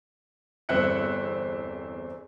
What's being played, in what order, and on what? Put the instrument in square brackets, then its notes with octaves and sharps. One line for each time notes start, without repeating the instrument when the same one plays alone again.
[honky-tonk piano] G1 E2 C4 E5 F#6 C#7